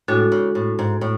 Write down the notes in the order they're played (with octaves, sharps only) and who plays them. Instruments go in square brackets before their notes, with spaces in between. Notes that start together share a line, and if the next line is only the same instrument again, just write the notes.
[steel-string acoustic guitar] A2 [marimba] G#3 D4 F#4 A4
[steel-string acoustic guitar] C#3
A2
G#2
A2